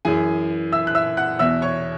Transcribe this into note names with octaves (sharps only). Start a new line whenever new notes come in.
F#2 E3 G#4 G#5
E5 E6
F#6
E5 E6
F#5 F#6
E2 B2 E5 E6
C#5 C#6